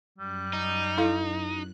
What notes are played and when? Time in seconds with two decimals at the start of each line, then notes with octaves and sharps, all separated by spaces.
0.18 F#2 G3 F#6
0.53 D#4
0.98 E4 A4 F5